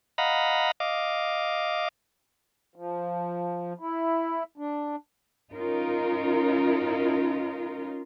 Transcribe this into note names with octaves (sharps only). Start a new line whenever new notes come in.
D#5 F5 F#5 A#5 B5
D#5 F5 D6
F3
E4
D4
C#4 D#4 F4 A#4